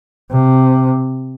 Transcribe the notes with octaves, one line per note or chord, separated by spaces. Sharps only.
C3